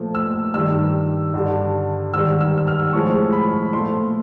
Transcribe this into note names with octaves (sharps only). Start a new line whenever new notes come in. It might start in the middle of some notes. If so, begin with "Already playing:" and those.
Already playing: A#2 F3 A3
E6
G2 D#3 G3 E6
G2 D3 G3
G#2 D#3 G3 E6
E6
E6
F6
A2 F3 G#3 C#6
B5
A#2 F3 A3 C6